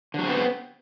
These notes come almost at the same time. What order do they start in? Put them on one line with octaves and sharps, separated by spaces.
D3 F#3 C4 B3